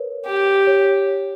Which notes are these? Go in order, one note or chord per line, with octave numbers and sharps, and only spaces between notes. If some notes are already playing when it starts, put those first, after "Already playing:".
Already playing: A#4 B4 C#5
G4
C#5